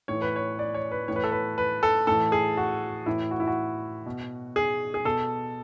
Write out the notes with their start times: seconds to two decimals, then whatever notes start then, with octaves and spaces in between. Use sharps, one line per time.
0.08 A2 E3 C#5
0.22 B4
0.36 C#5
0.59 D5
0.74 C#5
0.91 B4
1.08 A2 E3 C#5
1.16 B4
1.23 A4
1.32 B4
1.58 B4
1.83 A4
2.07 A2 E3 A4
2.32 G#4
2.57 F#4
3.06 A2 E3 E4
3.31 F#4
3.40 E4
3.47 F#4
4.06 B2
4.56 G#4
4.94 G#4
5.05 B2 A4